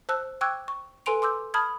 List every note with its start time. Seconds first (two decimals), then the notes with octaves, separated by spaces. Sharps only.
0.09 C5 A5 E6 F#6
0.41 G5 C#6 D6 E6 F#6 G#6
0.68 C#6
1.06 A4 B4 G#5 C6 D7 F7
1.22 C6 D6 E6 G6
1.54 A5 B5 D#6 F6 G#6